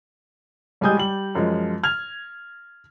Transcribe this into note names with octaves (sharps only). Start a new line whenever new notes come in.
A1 G3 G#3 G#5 D#6 G6
G3 F#7
F#2 F3 G#3
F6 G#6 F7